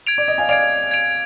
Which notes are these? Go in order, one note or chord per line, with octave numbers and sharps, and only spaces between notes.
G#6 D7 F7
D5
D#5
F5 G#5
D5 F5 G#6 D7 F7
G#6 D7 F7